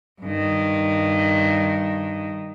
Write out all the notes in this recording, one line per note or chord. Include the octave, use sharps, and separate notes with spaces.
G2 D#3